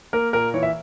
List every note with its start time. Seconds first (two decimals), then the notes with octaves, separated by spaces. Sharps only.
0.13 A#3 A#4
0.33 A#2 A#4
0.54 E3 C#5
0.63 E5